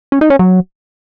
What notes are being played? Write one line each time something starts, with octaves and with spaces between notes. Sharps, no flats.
C#4
D#4
C#4
F#3